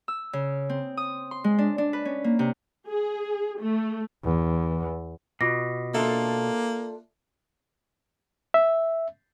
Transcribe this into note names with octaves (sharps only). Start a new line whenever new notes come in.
E6
C#3
C4
D#6
C6
G#3
D4
D4
B4
C#4
A#3
C3
G#4
A3
E2
B2 F4 D6 A#6
A#3 D4 F4 A4 E5
E5